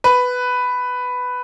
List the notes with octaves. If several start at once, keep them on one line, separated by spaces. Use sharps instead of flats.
B4